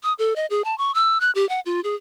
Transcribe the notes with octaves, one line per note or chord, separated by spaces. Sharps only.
D#6
A4
D#5
G#4
A5
C#6
E6
F#6
G4
F#5
F4
G#4